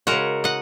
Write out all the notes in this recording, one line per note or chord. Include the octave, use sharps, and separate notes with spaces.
C#3 G#3 F#4 A#4
D#5 F#5